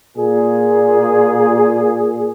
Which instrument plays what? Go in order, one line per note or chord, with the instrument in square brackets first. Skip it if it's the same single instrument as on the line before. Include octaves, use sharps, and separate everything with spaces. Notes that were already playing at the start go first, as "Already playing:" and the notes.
[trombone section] A#2 G#4